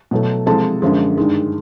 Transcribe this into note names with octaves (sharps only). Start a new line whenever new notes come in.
B2 F#3 A3
C3 F3 G#3 A4 A5
F#2 D3 F3 G#3
G2 D#3 G#3